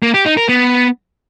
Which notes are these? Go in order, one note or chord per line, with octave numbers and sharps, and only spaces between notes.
A#3
G4
D#4
A#4
B3